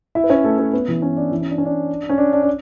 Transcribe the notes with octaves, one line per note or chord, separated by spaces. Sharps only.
E4 E5
B4
C#4 C#5
A3 A4
A3 A4
B3 B4
E3 E4
C#4
D4
E3 E4
C#4
D4
C#4
D4
C#4
D4
D4
D4